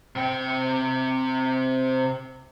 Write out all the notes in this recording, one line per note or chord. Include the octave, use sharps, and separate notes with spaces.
C3 G5